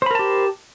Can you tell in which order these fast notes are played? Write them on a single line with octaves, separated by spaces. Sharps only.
C5 B5 A#4 A5 G4